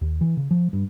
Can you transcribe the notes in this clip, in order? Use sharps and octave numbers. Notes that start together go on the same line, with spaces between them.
D#2
E3
C#3
F3
G2